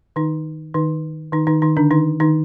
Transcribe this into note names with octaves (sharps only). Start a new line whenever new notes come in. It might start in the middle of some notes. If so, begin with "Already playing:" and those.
D#3 D#4
D#3 D#4
D#3 D#4
D#3 D#4
D#3 D#4
D3 D4
D#3 D#4
D#3 D#4